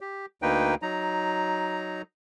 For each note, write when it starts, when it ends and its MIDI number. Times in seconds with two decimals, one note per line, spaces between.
0.01 0.26 67
0.42 0.75 38
0.42 0.75 58
0.42 0.75 63
0.42 0.75 71
0.42 0.75 79
0.82 2.02 54
0.82 2.02 63
0.82 2.02 82